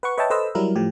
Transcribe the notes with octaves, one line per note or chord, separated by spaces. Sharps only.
B4 F#5 C#6
B4 C#5 D#5 E5 G5 A5
A4 B4 C5 D#5 E6
F#3 G3 E4 A#4
A2 F3 G4